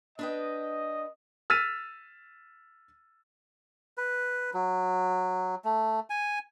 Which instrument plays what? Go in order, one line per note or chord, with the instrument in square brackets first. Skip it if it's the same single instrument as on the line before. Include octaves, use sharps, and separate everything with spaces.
[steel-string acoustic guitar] D4 B4 G5 [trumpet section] D#5
[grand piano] E6 F6 A6 B6 D#7
[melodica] B4
F#3
A3
G#5